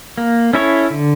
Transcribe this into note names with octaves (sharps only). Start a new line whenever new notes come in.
A#3
C#4 E4 A4 C#5
D3